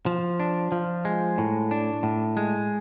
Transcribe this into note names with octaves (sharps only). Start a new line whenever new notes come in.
F3
D4
F3
G#3
A2
D4
A2
G#3